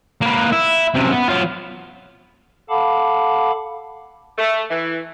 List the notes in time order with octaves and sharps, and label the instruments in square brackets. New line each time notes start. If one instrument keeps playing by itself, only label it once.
[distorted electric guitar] A#3 B4
E4
F#2 C3
B3
F#3 F4
[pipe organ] A4 F5 F#5 A5 B5 D6
[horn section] A3
E3